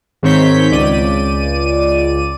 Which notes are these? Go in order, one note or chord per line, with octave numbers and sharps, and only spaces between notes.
G#2 D#3 C4 C#5 G6 B6
C#2 D5 D#7